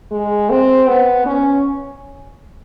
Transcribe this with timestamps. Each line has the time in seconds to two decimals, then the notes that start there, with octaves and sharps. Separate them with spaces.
0.11 G#3
0.50 C4
0.87 B3
1.26 C#4